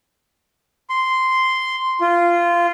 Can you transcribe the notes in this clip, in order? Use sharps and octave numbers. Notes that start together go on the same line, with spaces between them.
C6
F4